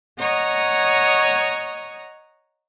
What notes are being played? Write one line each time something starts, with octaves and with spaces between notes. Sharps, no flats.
C#5 D#5 F#5 A#5 C#6 D#6